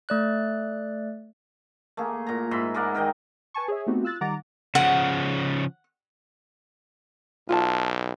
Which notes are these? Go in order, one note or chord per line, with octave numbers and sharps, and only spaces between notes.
A3 D5 F#6
A3 A#3 G#4
A#2 A#5
G#2 E5 B5 C6
G#3 A#4 D5 F#5
D#3 A#4 D#5 G5
B4 G#5 A5 C#6
G#4 C#5 E5
A3 B3 C4 D#4 F#4 G4
F4 E6 F#6 A6
D#3 G3 F#5 A#5 D6 A6
C#3 F3 F#5
B1 F4 A5